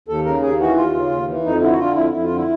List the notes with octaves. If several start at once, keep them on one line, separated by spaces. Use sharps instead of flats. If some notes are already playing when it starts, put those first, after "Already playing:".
D#2 A4
C#3 A#4
D#2 G#4
E3 F#4
D#2 F4
C#3
D#2
E3
F2 D#4
D3 E4
F#4
D3 F4
F2 E4
F2 E4
F4
D3
E4